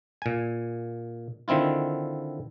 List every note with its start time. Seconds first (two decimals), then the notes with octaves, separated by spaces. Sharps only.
0.22 A#2 G#5
1.48 D3 D#3 C4 E4 F4